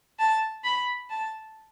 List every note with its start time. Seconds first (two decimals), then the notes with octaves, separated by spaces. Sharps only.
0.19 A5
0.64 B5
1.10 A5